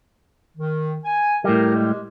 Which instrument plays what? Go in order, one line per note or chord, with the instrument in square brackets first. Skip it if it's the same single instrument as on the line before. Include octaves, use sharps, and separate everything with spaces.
[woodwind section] D#3
G#5
[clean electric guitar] A2 G3 [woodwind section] A#4
[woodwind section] G#3 G4